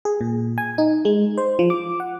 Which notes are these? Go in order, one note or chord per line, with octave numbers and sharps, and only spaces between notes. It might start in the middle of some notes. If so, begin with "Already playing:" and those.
G#4
A#2
G#5
D#4
G#3
C5
F3
D6
F#5